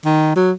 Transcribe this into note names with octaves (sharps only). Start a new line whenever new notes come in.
D#3
F#3